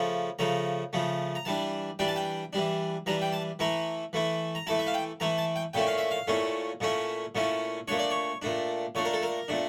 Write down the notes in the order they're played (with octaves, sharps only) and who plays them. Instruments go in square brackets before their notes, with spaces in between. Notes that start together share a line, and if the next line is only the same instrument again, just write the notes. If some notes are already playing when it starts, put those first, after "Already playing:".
Already playing: [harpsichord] C#3 F3 A3
C#3 F3 A3 A#5
C#3 F3 A3
A#5
E3 G3 D4 A5
E3 G3 D4 G5
A5
G5
E3 G3 D4
E3 G3 D4 A#5
G5
A5
E3 A3 E4 A#5
E3 A3 E4
A#5
E3 A3 E4 A5
E5
F5
G5
E3 A3 E4 A#5
A5
G5
A#2 A3 C#4 E4 G5
F5
E5
F5
A#2 A3 C#4 E4
A#2 A3 C#4 E4
A#2 A3 C#4 E4
A#2 A3 D4 C#5
D5
C#5
A#2 A3 D4
A#2 A3 D4 C#5
A#4
A4
A#4
A#2 A3 D4